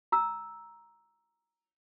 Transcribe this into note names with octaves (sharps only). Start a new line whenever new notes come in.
A#5 E6